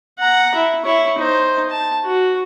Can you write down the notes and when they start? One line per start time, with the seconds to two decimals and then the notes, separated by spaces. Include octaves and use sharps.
0.19 F#5 A#5
0.55 E4
0.84 E4 C#5
1.18 D#4 C5
1.70 A5
2.04 F#4